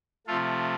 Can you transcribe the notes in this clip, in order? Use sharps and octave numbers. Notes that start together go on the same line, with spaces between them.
C3 F3 A3 F4 A4